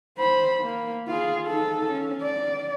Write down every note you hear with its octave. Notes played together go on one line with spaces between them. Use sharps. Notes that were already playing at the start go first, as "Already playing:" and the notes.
C5 B5
A#3
F4 G#4
D#4 A4
C#4
D5